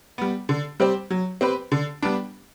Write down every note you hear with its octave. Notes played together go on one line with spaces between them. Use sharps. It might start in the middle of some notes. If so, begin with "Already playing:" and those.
G3 B3
D3
G3 C4 G4 C5
F#3
C4 G4 B4
D3
G3 B3 D4